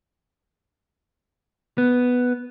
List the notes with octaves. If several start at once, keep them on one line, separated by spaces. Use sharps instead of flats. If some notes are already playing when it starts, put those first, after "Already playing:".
B3